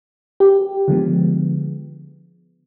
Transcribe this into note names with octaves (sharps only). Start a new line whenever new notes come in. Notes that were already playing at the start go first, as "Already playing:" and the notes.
G4
D3 F3 G#3 B3